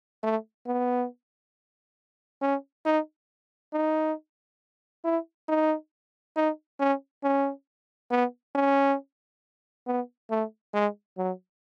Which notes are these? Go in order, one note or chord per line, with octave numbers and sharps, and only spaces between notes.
A3
B3
C#4
D#4
D#4
E4
D#4
D#4
C#4
C#4
B3
C#4
B3
A3
G#3
F#3